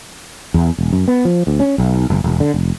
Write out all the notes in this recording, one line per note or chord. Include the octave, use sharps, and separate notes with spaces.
E2
E1
F#2
B3
F3
D2
C#4
B1
F#1
E1
D3
F1